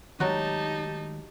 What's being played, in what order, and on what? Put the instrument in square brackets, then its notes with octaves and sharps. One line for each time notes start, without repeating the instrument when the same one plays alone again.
[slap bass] D#3 G#3 A3 [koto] F#3 F#4 [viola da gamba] D#4 [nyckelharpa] G4 A5